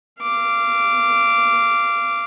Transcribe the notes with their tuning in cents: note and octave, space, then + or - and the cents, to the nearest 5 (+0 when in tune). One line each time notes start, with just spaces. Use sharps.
F5 -20 D6 -5